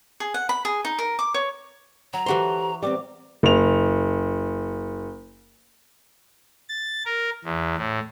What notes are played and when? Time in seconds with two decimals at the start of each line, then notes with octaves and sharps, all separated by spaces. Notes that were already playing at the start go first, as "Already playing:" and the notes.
0.20 G#4
0.34 F#5
0.49 B5
0.65 G#4
0.85 D#4
0.98 A#4
1.19 D6
1.34 C#5
2.13 F#3 A#5
2.26 E3 F#4 G4 A4 C5 C6
2.83 G3 B3 C4 D6
3.43 F#1 F7
6.69 A6
7.06 A#4
7.44 E2
7.77 A2